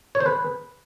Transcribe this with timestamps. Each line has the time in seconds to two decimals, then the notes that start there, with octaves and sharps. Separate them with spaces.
0.15 C#5
0.20 C5
0.26 B4